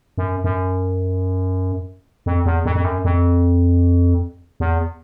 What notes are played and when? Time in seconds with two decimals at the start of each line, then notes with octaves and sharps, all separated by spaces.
0.18 F#2
0.44 F#2
2.26 F2
2.46 E2
2.65 F2
2.75 F2
2.84 F#2
3.05 F2
4.60 E2